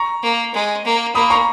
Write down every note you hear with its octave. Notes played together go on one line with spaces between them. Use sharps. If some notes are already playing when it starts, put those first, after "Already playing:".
Already playing: A#5 C#6
A#3
G#3
A#3
A#3 B5 D#6
A#5 C#6